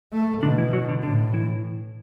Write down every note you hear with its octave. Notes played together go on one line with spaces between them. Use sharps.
A3
B2 D3 D4
E3 E4
F#3 F#4
D3 D4
A2 D3 D4
E3 E4